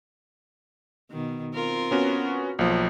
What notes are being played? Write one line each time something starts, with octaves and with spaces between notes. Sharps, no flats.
B2 D#3
C4 F4 A#4
B3 C#4 F#4
B1 F3 A#3